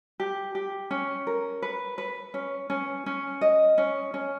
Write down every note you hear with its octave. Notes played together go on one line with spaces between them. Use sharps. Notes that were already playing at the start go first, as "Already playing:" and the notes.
G4
G4
C#4
A#4
B4
B4
C#4
C#4
C#4
D#5
C#4
C#4